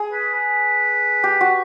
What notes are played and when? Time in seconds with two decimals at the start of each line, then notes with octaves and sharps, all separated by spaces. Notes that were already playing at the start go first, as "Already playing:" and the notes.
Already playing: G#4
0.12 B4
0.34 B4
1.24 G4
1.41 F#4